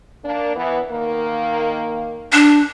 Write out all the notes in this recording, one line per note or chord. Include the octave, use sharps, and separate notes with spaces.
A#3 D4
E3 B3
D#3 A#3
D4